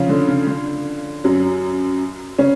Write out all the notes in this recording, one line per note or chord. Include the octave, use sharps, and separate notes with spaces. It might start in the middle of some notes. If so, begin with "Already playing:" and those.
Already playing: C#3 F3 C#4 F4
D3
C#3
D3
F#2 F#3
C#3 C#4